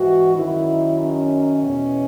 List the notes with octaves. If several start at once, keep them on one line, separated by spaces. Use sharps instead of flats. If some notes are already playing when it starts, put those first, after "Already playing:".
Already playing: G#2 E3 F#4
F#2 D#3 E4
C#4
E2 B2